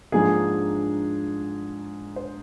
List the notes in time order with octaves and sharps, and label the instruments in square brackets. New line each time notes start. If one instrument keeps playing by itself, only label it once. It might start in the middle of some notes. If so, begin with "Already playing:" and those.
[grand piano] G#2 F3 A#3 D4 G#4
C5